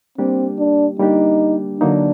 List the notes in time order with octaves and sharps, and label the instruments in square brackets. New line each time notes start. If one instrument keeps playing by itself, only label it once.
[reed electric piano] G3 A#3 D4 G4 [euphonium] C4
[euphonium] D4
[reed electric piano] G3 A#3 D4 G4 [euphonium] D#4
[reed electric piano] D3 F#3 A#3 D#4 [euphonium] D4